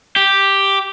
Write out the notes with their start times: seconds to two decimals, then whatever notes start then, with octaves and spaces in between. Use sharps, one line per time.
0.16 G4